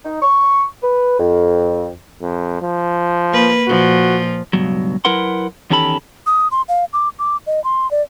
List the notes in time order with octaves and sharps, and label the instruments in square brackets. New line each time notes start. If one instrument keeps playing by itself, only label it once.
[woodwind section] D#4
C#6
B4
F2
[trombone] F2
F3
[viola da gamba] A#3 B4
[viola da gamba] A#2 F3 [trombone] F#4
[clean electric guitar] C#2 G2 B2 F#3
F#3 E4 A#4 B4 F#5 C6
E2 D#3 C#4 G4 A4 B5
[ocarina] D#6
C6
F5
D6
D6
D#5
C6
D5